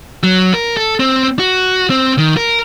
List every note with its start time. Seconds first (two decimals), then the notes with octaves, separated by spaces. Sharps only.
0.24 F#3
0.54 A#4
0.77 A4
1.00 C4
1.39 F#4
1.90 C4
2.18 D#3
2.37 A#4